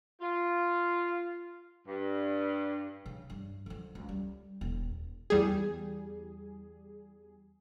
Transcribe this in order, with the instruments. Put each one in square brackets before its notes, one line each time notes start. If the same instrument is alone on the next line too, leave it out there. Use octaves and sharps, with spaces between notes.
[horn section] F4
G2
[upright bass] C#3
G2
D3 F3
C#2
G3
D#1
[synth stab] E2 G3 G#4